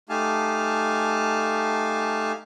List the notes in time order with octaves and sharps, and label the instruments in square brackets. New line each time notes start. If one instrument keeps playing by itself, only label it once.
[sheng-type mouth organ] A3 D#4 G4 F5 G#5 A5